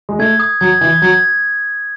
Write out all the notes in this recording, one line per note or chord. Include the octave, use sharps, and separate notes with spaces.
G#3
A3 G#6
D#6
F#3 G#6
E3 G#6
F#3 G#6